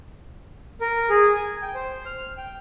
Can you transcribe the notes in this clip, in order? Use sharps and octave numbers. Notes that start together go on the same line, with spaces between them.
A#4
G#4
G#5
G5
C5
F6
G5